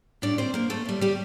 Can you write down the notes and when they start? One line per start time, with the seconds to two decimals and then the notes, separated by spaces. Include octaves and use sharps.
0.22 A2 G3 D4 D5
0.38 C4 C5
0.54 A#3 A#4
0.70 A3 A4
0.85 A2 G3
1.01 G3 G4